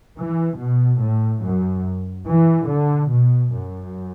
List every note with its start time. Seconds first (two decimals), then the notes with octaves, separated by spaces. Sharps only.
0.17 E3
0.59 B2
1.01 A2
1.44 F#2
2.28 E3
2.70 D3
3.12 B2
3.54 F#2